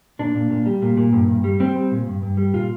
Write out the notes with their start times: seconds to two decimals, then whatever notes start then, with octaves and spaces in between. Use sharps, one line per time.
0.19 A#2 D4
0.35 A#2
0.50 A#2
0.66 G3
0.82 A#2
0.97 A#2
1.13 G2
1.28 G2
1.44 G3
1.60 G3 C4
1.76 G3
1.91 A#2
2.06 G2
2.22 G2
2.37 G3
2.54 A#2 F4